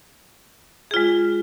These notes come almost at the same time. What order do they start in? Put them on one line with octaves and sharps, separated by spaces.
G#4 F4 G#3